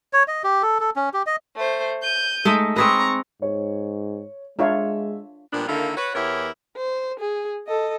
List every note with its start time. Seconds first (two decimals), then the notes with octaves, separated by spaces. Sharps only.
0.13 C#5
0.28 D#5
0.44 G4
0.63 A4
0.80 A4
0.96 C#4
1.14 G4
1.26 D#5
1.56 A3 C5
2.03 G6 D#7
2.45 G#3 A3 D#4
2.76 C4 G#4 B4 A#5 C#6
3.42 G#2 C#5
4.59 G#3 D4 F4 C#5 E5
5.53 A#2 F3 G3 B3 D4
5.68 D3 D#3 A#3 E4 F4
5.97 F#4 B4 C#5
6.15 E2 B3 E4 G4 A#4 C#5
6.77 C5
7.20 G#4
7.67 A4 D#5